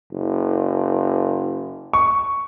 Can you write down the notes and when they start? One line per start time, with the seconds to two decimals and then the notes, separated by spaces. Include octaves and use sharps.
0.12 F#1
1.93 C#6